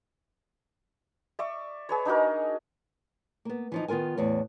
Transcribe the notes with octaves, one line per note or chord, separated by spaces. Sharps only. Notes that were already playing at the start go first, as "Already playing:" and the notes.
D5 E5 C#6
G#4 B4 C#5
D4 D#4 F#4 A#4
A#3 B3
E3 F3 D#4
D#3 B3 F4 A#4 G#5
E2 A2